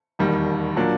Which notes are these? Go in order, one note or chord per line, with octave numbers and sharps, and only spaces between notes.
E1 D#2 D#3 G3
A#2 F#3 A#3 D4